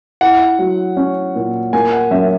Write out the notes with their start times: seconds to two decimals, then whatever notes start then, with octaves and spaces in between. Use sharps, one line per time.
0.21 E4 F#5
0.59 F#3
0.97 C#4
1.35 A#2
1.73 A#3 G#5
1.93 F#5
2.11 F#2 E5